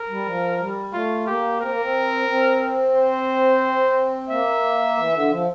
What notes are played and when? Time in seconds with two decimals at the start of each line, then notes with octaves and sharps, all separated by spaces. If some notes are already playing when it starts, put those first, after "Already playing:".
Already playing: A#4
0.09 G3
0.25 F3
0.60 G3
0.92 A3 F4
1.26 A#3 G4
1.60 C4 A#4
1.71 A#3
1.82 C4
2.28 C4
2.95 C5
4.29 A#3 E5
4.97 E3
5.14 D3
5.30 F3